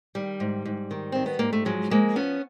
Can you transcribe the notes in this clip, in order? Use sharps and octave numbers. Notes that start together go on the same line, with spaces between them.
D#3 G3
G#2
G#2
D#3
D#3 C4
B3
G#2 A#3
A3
F3 F#3 G#3
F3 G#3 A#3
F3 B3 C#4